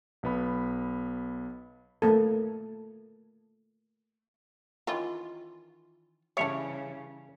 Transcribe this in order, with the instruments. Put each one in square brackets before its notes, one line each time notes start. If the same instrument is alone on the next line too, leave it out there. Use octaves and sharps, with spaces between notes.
[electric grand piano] B1 B3 B5
[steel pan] A3 A#3 A4
[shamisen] D#3 E3 C#4 [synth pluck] F4
[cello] C#3 E3 [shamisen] G3 C#4 D4 [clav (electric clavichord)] C#5 [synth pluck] E5